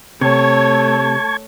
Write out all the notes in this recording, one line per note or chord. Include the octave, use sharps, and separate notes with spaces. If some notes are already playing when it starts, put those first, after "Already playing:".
C3 A3 C#5 A5 C#6 G#6